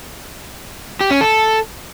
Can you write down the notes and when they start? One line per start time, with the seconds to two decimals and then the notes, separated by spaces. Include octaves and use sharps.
1.01 G4
1.11 C#4
1.21 A4